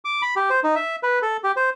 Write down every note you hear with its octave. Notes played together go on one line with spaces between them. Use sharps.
D6
B5
G4
C5
D#4
E5
B4
A4
G4
C5